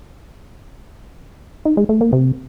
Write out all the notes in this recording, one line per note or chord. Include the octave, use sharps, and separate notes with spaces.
D#4
G#3
A3
A#3
C3